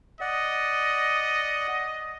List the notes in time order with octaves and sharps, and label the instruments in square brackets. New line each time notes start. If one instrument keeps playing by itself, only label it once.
[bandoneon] D5 F#5 [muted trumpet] D#5